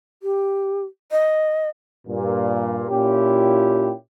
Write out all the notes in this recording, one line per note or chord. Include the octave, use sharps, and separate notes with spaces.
G4
D#5
G2 A#2
A#2 C#4 E4 F4 G4